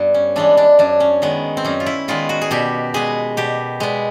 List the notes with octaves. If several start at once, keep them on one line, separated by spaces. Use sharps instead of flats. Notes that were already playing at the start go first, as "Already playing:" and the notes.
Already playing: G2 B3
C#4
E3 G#3 B3 D4
D4
F#2 D4
C#4
D#3 G#3 B3
C4
F#2 C#4
F4
E4
D#3 G#3 B3 F4
F#4
G#4
B2 G4
G#3 B3 G#4
B2 G4
G#3 B3